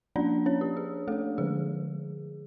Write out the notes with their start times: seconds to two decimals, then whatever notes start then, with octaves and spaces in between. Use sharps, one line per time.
0.16 F3 A#3 C#4 D4 D5
0.46 C#4 C#5
0.61 G4
0.77 G#4
1.08 A3 A4
1.38 D3 F3 G#3 G#4